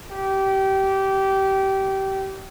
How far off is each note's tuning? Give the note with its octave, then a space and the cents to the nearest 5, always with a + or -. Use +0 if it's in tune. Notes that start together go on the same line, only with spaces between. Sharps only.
G4 -20